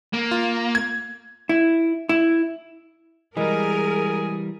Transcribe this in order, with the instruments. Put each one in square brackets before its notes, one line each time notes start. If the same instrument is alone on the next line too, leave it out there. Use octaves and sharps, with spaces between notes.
[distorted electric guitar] A#3
[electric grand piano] F4
G#6
[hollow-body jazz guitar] E4
E4
[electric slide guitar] E3 G3 [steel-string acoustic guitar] G#3 [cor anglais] G#4 [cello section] A#4